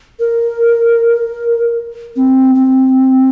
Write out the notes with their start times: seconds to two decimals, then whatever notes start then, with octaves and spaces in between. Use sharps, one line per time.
0.20 A#4
2.16 C4
2.55 C4